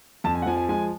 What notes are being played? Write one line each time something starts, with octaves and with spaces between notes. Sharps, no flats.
F2 A5
G#5
F#5
F3 G#5
G#5
G#3 G#5